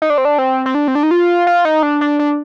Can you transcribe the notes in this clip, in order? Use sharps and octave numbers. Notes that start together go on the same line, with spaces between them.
D#4
D4
C4
D4
C4
C4
D4
C4
D4
D#4
F4
F4
D#4
D4
D4
D4